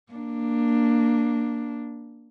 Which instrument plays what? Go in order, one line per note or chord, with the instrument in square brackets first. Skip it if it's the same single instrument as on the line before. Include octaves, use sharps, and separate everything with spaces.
[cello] A#3 D4